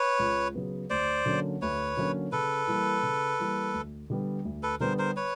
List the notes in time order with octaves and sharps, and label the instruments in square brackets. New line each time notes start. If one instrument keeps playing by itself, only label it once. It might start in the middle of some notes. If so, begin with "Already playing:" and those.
Already playing: [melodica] B4 C#5
[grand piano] C#2
C#3 F#3 B3
[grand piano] D2 [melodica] C5 D5
[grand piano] D3 F#3 A#3 C#4
[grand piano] D2 [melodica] B4 C#5
[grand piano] D3 F#3 A#3 C#4
[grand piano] C#3 [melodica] A4 B4
[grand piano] E3 G3 A#3
C#3
E3 G3 A#3
D2
D3 G3 B3
D2
[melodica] A4 B4
[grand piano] D3 G3 B3 [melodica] A#4 C5
[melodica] A#4 C5
B4 C#5